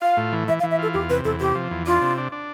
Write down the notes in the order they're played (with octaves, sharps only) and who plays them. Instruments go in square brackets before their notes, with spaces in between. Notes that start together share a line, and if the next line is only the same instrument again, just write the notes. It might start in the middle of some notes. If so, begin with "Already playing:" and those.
[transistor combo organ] F4 [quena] F5
[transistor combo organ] A2
E3
[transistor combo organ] E3 [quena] E5
[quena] F5
[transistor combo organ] E3
[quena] E5
[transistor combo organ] F4 [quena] A4
[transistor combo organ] E2 [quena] G4
[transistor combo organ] C3 [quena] B4
[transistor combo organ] E2 [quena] A4
[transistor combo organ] C3 [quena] G4
[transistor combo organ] F3
E2
[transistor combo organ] D4 [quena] F4
[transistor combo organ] C3
D4
D4